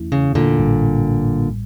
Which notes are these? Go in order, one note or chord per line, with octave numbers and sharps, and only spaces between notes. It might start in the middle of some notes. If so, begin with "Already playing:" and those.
Already playing: E2 E3 A3 C#4 E4
C#3
A#2 D3
A1 A2 G3